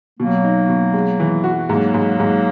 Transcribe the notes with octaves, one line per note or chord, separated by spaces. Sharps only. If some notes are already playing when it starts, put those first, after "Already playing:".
B2 F#3 A#3
D#4
B2
G#3
E3
F#4
G#2 F#3 A#3
G#2
G#2